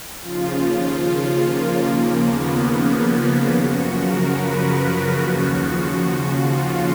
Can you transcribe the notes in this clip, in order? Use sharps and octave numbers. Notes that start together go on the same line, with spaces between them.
D#2 C#3 F3 F4
F4
A#3
D#2 C#3 F3
B3
A#3
A#3
F#2 C#3 F3 F#4
A#4
B4
A#4
D#2 C#3 F3 F#4
F4